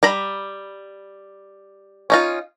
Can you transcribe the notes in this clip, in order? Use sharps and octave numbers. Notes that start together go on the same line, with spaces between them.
G3 A#5 B5
C#4 D#4 F4